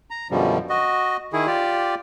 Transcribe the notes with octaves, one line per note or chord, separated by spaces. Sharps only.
A#5
F#2 B2 D3 F3 G3
F#4 D#5
D#3 E4 G#4
F4 G4 D5